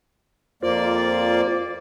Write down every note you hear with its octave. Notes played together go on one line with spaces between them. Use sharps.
F2 A#3 F4 C5 D5